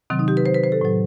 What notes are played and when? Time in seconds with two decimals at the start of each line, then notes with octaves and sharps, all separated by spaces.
0.10 C3 D#3 F#3 C4
0.19 D#4
0.28 G4
0.37 B4
0.46 C5
0.55 B4
0.64 C5
0.72 A4
0.81 A2 F#3